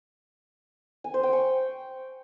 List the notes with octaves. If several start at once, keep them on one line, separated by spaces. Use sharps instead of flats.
G#5
C5
G5
C#6